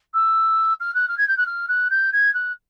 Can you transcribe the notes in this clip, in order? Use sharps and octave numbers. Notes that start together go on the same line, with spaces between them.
E6
F6
F#6
F6
G#6
G6
F#6
F6
F#6
G6
G#6
F#6